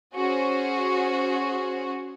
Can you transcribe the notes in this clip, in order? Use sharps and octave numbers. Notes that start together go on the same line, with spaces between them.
C#4 F#4 G#4 C5